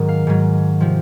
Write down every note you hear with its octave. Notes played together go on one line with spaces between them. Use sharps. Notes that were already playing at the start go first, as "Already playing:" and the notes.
Already playing: G#2 D#3 F#3
F5
G#2 F#3
C3 F3